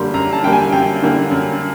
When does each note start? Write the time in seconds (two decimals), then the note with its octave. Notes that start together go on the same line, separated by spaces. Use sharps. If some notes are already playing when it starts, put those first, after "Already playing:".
Already playing: F#2 D3 G3 A#3 C6
0.14 F#2 A#5
0.33 A5
0.43 D3 G3 A#3 G5
0.53 G#5
0.72 F#2 G5
1.02 D3 G3 A#3
1.31 F#2